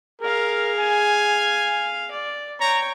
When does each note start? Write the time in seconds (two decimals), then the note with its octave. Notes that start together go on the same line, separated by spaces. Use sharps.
0.21 G#4 A#4 F5
0.78 G#5
2.11 D5
2.60 C#5 G5 A#5